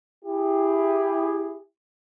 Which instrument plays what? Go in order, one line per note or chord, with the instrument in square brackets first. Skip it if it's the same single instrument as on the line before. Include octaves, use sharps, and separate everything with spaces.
[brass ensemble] E4 G4 G#4